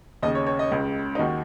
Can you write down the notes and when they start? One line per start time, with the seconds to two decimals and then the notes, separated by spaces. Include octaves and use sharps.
0.22 D#2 C#3 D#5
0.35 C#5
0.47 C#5
0.59 D#5
0.71 C#2 C#3
1.15 D#4
1.19 D#2 D#3 F#4